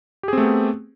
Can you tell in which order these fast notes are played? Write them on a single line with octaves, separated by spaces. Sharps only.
G4 G#4 C4 A3 B3